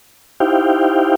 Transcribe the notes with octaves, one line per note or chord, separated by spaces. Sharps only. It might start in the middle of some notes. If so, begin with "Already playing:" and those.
D#4 E4 G4 C5 F5 G5